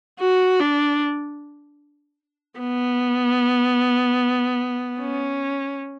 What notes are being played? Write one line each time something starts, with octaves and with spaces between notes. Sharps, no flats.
F#4
D4
B3
C#4